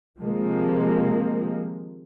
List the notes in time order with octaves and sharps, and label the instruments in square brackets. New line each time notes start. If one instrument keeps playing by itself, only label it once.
[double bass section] C3 D#3 F3 G#3 A#3